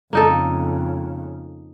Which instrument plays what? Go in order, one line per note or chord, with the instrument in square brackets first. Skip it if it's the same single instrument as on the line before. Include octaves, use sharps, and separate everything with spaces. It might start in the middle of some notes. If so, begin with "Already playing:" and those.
[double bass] F2 C#3 [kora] A#3 D#4 A4